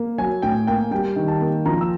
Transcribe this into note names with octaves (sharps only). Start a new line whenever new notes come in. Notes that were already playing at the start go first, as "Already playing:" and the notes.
Already playing: A#3
F#3 G#5
A2 G5
A#3 G5
G3 G5
D#3
A5
A#3
F3 A#5
E6